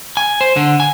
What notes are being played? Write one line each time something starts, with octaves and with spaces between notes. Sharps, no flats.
G#5
C5
D3
G#5